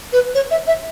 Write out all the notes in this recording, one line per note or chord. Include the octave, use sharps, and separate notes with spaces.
B4
C#5
E5
E5